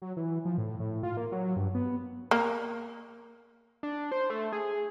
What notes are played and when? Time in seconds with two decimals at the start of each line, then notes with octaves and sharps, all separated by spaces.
0.02 F#3
0.17 E3
0.45 F3
0.58 A2
0.80 A2
1.03 F4
1.17 A#3
1.32 F#3
1.56 G2
1.74 B3
2.31 A#3
3.83 D4
4.12 C5
4.30 A3
4.52 G#4